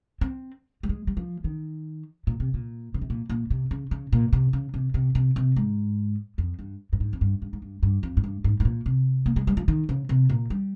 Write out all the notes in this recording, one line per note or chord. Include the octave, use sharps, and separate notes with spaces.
C4
G3
G#3
G3
F3
D#3
A#2
C3
A#2
C#3
C3
A#2
A#2
C3
C#3
C#3
A#2
C3
C#3
C3
C3
C3
C3
G#2
F2
G2
G2
G#2
F2
G2
G2
G#2
G2
G2
F2
G#2
G2
G#2
G#2
A#2
C3
A#3
G#3
G3
F3
D#3
C#3
C3
A#2
G3